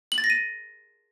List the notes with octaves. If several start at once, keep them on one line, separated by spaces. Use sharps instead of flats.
F#7
A6
A#6
D#7